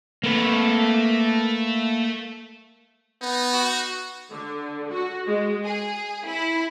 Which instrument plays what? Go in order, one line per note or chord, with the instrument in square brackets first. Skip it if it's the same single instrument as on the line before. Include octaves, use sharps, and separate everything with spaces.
[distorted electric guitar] A3 [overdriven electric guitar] A#3 B4
[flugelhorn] B3 [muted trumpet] D#4
[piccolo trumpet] F#4
[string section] D3
F#4
G#3
G#4
E4